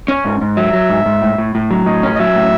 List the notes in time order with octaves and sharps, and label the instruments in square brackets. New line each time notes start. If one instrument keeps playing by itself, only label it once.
[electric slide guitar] C#4
G#2
G#2
[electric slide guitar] F#3 [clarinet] E5
[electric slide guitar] F#3
G#2
G#2
A2
A2
A2
F#3
[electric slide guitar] A2 [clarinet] D#5
[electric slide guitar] C#4
[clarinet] D#5
[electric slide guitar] F#3 [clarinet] E5
[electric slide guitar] A2